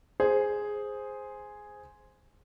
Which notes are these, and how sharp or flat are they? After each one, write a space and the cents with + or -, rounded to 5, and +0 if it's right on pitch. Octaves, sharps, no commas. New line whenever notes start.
G#4 +0 C5 +0